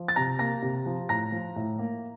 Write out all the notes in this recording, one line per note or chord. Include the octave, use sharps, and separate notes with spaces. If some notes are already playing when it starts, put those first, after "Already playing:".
Already playing: F3
A6
C3 A#5 A#6
A#3 A#5 A#6
C3
F3
A2 A#5 A#6
F3
A2
A#3